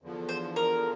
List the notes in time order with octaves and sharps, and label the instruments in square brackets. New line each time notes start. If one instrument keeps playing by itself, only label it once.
[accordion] E2 D3 F3
[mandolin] C5
A#4